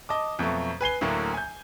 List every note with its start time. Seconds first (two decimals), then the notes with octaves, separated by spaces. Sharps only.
0.09 D#5 A5 D6
0.39 F2 B2 F#3 A3
0.81 B4 G#5 C7 G7
1.01 D2 A2 D3 F#3 A#3
1.34 G#5 G6